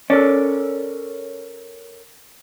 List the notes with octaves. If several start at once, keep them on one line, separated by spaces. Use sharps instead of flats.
C#4 A4 A#4 C#5 D5